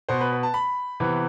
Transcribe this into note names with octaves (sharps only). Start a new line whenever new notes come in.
B2 B3 C5
B4
B4
A5
B5
C3 E3 B3